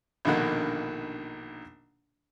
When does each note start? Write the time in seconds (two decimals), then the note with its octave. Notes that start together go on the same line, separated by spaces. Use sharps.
0.25 A#1 B2 D3 D#3 A#3 F#5